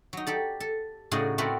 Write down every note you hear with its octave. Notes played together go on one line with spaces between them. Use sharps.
F#3 D#4
G4 A4 D5
A4
A2 C#3 D#4 F#4 G#4 D5
A3 C4 F#4 A#4 B4 D5